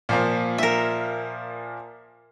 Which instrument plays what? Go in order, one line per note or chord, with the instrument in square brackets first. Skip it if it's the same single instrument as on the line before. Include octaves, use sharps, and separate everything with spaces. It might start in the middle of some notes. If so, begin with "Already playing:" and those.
[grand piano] A#2 F3 A#3
[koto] A#4 E5